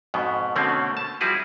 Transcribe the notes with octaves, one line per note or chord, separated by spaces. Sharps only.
F2 G#2 B2 B3
B2 D3 A3 A#3 C4 C#4
A5
F3 G3 E4 F#4 G#4 B4